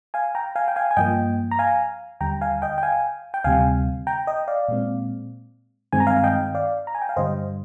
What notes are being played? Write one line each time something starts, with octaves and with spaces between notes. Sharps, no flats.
F5 G#5
G5 A#5
F5 G#5
G5
F5 G#5
G#5
G2 F3 A#3 D#5 G5
A#5
F5 G#5
D#2 D3 G3 G5 A#5
F5 G#5
D#5 G5
G5
F5 G#5
G5
D2 C3 G3 F5 G#5
G5 A#5
D#5 G5
D5 F5
A#2 G#3 C4
G2 D#3 G#3 C4 G#5
A#5
F5 G#5
F5
D#5 G5
D5 F5
A#5
G#5
G5
F5
G2 D3 G3 C5 D#5